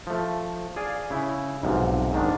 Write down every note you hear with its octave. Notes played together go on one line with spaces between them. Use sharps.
F3 A3
G#4 D5 F5 G#5
C#3 E4
B1 G#2 C3 F3
G#2 D#3 D4